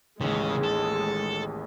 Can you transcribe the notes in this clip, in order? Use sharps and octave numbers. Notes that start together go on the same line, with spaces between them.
A1 D#2 C#3 G#3
A4